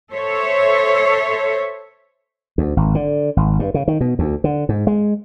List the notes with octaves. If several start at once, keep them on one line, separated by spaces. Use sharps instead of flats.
A4 C5 C#5 E5
D2
G#1
D3
G#1
G2
C#3
D#3
B2
D2
D3
G#2
G#3